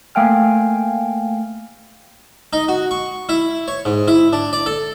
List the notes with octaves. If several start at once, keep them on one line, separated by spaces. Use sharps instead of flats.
A3 A#3 F5 G5 G#5 F6
D#4
F#4
C#6
E4
C#5
G#2
E4
D4
D5
A4